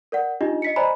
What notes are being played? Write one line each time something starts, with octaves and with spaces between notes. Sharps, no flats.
A#4 D5 F#5
D4 D#4 F4 G4 D#5
D#5 B6 C#7
C5 D5 D#5 G#5 A#5 B5